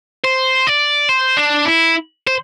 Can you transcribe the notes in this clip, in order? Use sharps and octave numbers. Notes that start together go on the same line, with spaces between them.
C5
D5
C5
D4
E4
C5